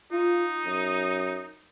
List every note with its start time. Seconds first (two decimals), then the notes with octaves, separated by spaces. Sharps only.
0.12 D#4 F4
0.65 F#2